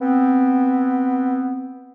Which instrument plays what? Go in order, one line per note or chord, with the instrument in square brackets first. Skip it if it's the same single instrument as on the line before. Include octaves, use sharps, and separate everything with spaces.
[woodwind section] B3 C4